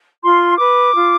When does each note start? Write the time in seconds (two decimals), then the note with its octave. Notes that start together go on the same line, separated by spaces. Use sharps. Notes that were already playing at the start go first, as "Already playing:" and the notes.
0.23 F4 C6
0.58 B4 D6
0.94 F4